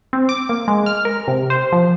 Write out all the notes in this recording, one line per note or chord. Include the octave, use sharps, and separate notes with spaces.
C4
D6
A#3
G#3
F6
A#4
C3
C5
F3